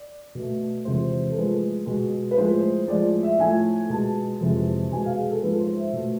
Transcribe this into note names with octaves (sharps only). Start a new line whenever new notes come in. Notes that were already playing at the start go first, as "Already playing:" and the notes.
Already playing: D5
B2 A3
E2 C3 F3 G#3 C5
A4
A2 F3 G#3 B4
B2 G#3
B4
A2 F3 G#3 C5
A2 F3 G#3 D5
E5
A2 F3 A3 G#5
B2 G#3 A5
F2 C3 E3 G#3
B2 G#3 G#5
F5
G#4
A4
G#2 F3 G#3 B4
C5
E5
B2 A3